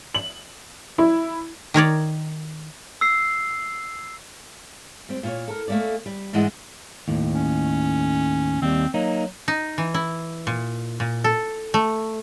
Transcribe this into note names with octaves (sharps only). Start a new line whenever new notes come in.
F#7
E4
D#3 A#4 C#5 D5
E6 C7
G3 C4
A#2 F4 C#5
A4 A#4
A3 A#3 C4 C#4 D5
G3
G#2 E3 G#3 D4 D#5 F#5
D#2 A2
C#4
D#2 G3 C4
F#3 A#3 D#4
D#4
E3
E4
A#2
A#2
A4
A3